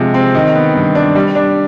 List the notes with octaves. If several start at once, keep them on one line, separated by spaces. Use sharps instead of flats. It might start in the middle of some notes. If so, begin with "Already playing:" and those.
Already playing: C3 F3 G#3
C4
D#3
B3
G2
D4
G3
D4